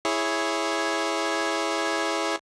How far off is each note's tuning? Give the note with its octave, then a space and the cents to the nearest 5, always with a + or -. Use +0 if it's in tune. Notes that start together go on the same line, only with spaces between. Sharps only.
E4 +0 G#4 +0 C#5 +0